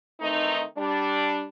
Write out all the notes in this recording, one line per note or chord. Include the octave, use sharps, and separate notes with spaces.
D#3 E3 A3 C4 D#4
G3 D4